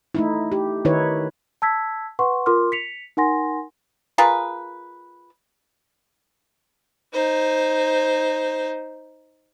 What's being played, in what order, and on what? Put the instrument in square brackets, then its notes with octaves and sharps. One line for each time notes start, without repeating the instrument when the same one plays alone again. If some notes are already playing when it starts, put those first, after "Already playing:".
[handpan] A3 D#4 E4
G4
D#3 D#4 E4 B4 C#5
[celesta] A5 E6 G#6 B6
B4 F#5 C6 C#6
F4 A#4 C6 D6 F6
B6 C#7 F7
D#4 A#4 F#5 G#5 C6 A#6
[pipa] F4 G#4 A#4 B4
[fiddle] D#4 C5